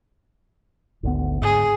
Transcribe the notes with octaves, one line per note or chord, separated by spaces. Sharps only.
G#1 D2 B3
G#2 D3 G#4